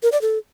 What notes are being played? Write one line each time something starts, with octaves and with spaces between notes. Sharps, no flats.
A#4
D5
A4